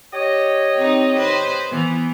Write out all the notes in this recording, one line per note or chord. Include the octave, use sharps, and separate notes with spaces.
G4 C#5 D#5
C4 D#4
B4 C5
E3 B3